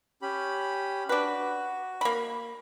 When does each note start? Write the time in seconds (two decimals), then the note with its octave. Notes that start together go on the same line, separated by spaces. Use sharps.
0.22 C#4 G4 B5
1.09 D4 F#4 B4
2.01 A#3 B5